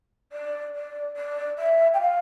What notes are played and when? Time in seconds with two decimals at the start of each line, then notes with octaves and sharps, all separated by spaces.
0.32 D5
0.75 D5
1.17 D5
1.58 E5
1.94 G5
2.01 F5